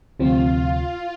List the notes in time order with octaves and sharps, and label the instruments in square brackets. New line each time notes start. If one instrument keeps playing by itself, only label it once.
[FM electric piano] D2 C3 F3 C4 [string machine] F4